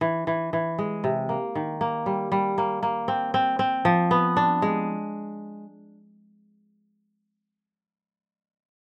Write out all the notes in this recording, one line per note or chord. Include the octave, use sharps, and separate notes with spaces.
E3
E3
E3
G#3
C3
A#3
D#3
A#3
G3
G3
A#3
A#3
C4
C4
C4
F3
B3
D4
G#3